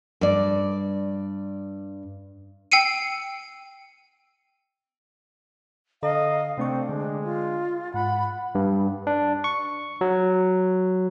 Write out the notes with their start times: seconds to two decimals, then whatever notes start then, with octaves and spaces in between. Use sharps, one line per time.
0.21 G2 D5
2.72 G5 E6 C7 C#7 D#7
6.03 D3 A4 D#5 F5 A#5
6.58 C3 A3 C4 D4 C#6
6.89 D3 G#3
7.24 F4
7.94 G#2 F#5 B5
8.55 G2
9.07 D4
9.44 C#6
10.01 F#3